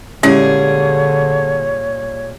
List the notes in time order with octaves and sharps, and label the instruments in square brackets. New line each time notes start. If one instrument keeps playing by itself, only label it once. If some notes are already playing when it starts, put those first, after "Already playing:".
[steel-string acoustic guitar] A#2 G3 G#4 [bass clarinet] D3 [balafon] G#3 C#4 E4 [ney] C#5